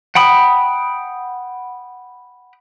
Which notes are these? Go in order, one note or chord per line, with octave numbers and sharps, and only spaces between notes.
F#5 G5 B5 D#6